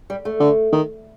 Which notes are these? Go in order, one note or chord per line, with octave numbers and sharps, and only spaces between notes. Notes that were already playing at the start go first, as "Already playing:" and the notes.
G3
A3
D3
D#3